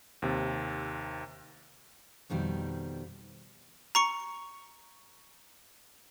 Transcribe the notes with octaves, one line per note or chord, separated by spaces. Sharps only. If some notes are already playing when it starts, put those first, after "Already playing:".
D#2 C3
F2 B2 D#3 G3
A#5 C#6 C#7